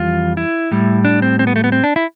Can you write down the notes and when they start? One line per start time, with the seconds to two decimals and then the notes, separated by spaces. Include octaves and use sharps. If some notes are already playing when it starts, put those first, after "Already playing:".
Already playing: F2 E3 G3 F4
0.37 E4
0.72 A2 G3
1.05 D4
1.22 C4
1.39 C4
1.47 B3
1.56 A3
1.64 B3
1.72 C4
1.84 D4
1.96 E4